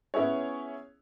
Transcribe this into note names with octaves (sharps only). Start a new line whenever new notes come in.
B3 C#4 E4 G#4 C#5